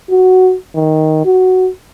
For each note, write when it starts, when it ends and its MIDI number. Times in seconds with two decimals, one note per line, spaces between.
0.11 0.55 66
0.75 1.22 51
1.25 1.69 66